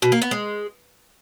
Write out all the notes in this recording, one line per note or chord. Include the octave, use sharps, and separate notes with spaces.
B2
A#3
B3
G#3